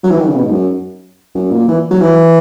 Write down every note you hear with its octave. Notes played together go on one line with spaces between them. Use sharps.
F#3
E3
D#3
C#3
B2
G#2
F#2
F#2
A#2
E3
F#3
E3